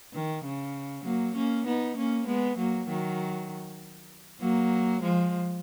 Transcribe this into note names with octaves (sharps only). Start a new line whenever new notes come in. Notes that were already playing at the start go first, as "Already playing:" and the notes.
D#3
C#3
F#3 A#3
A#3 C#4
B3 D#4
A#3 C#4
G#3 B3
F#3 A#3
D#3 F#3
F#3 A#3
F3 G#3